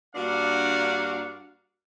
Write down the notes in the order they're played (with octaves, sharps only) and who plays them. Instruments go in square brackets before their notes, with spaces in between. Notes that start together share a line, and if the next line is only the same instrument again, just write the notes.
[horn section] G2 A#3 D4 F#4 F5 F#5